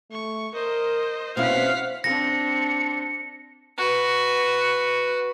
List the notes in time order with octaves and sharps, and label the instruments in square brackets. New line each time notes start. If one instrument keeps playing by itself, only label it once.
[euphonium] A3 [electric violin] C#6
[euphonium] A#4 [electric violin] C5 D#5
[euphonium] B2 [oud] C4 C#4 E4 [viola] F5 [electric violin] F#5 B6
[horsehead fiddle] C4 D4 [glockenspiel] A#6 [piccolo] C#7
[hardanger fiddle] F#4 B4